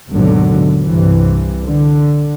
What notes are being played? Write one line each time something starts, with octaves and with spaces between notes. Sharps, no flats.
G#1 D#2 B2 D3 F#3
C2 G2 C3 E3
D3